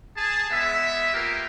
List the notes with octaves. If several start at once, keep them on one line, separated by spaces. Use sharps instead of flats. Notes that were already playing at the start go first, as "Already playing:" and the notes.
G#4 A5
G#3 B3 E5
A#3 F4 G4 A#4 B4